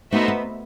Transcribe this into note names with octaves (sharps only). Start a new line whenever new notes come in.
A3 B3 D#4 F#4 C5 E5
B3